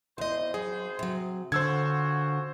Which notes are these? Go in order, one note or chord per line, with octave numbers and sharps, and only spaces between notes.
G#1 E2 C5 D#5
F#3 G#4
C3 F#3
A#2 D3 C#4 F#4 C5 E6 G#6